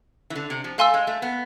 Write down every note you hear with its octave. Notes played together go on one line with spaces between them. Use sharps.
E3
D3
C3
F3
A3 F5 G#5 C6 E6
G#3
A3
B3